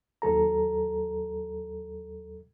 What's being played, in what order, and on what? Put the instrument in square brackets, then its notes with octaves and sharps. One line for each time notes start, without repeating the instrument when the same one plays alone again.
[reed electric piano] D#2 F#3 A4 A#5